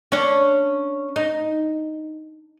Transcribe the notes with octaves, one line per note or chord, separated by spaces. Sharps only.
C#4 D4 C#5
D#4